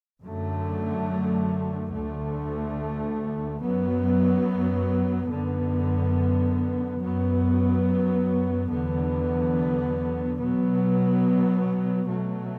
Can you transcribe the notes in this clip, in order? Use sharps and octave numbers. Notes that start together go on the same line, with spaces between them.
F#2 D3 F#3 A3
D2 D3 A3
F#2 F#3 B3
F#2 D3 B3
F#2 F#3 B3
E2 D3 F#3 B3
B2 F#3 B3
B2 F#3 A3